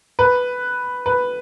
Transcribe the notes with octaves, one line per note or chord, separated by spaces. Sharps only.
B4
B4